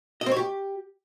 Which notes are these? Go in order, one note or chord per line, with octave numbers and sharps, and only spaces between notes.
D#5
C4
C#5
G4